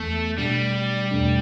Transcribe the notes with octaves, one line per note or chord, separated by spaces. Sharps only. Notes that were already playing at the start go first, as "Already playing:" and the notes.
Already playing: E2 E3 A3 B3
B2 G3 A3 D4
E2 B2 A3 D4